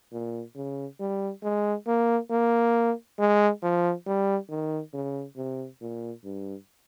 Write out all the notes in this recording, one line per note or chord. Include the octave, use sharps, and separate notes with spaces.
A#2
C#3
G3
G#3
A#3
A#3
G#3
F3
G3
D#3
C#3
C3
A#2
G2